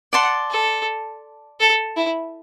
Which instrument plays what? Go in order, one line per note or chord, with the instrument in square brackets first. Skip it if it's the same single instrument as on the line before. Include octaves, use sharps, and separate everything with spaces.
[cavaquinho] D5 A5 C6 [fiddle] F#5
[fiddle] A4
A4
E4